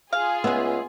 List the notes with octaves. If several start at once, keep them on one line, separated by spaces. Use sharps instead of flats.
F4 G#4 F5
C#2 G#3 B3 E5